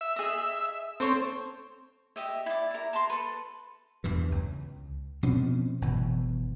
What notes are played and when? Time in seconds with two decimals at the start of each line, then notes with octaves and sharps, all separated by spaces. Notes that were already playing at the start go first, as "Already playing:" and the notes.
0.01 E5
0.16 G#4 D#5
1.00 C4 A4 C5 C#5
2.16 G4 D#5 E5
2.46 E4 D5
2.71 E4 A#4
2.93 A5 A#5 C6
3.10 A4 B4
4.04 E2 G2 E3
4.32 C#2
5.23 B2 F3 C4 C#4
5.81 G1 B2 E3